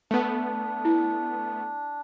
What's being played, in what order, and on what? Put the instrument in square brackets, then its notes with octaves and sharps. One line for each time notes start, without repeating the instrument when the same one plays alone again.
[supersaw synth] A3 B3 [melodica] D4
[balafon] E4